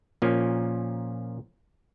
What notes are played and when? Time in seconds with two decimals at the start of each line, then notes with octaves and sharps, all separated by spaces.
0.22 A#2 F3 A#3 C#4